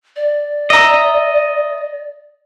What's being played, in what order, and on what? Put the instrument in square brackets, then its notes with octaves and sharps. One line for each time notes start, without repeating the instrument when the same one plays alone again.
[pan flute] D5
[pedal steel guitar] D#5 [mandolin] E5 A#5